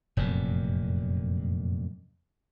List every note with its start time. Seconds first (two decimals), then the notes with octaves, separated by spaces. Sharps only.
0.17 F1 F#2 A#2